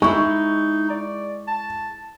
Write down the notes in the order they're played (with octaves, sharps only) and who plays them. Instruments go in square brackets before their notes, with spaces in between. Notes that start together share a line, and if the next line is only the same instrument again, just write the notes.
[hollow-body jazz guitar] G#3 E4 [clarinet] D#4 [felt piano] C#6
[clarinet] D5
A5